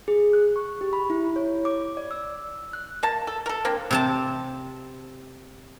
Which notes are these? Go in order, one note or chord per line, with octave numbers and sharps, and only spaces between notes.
G#4
F#6
C#6
G4
B5
E4
C#5
D6
D5
E6
F#6
A#3 A5
A4
A4 A#4
A#3 C4 D4
C3 C4 A5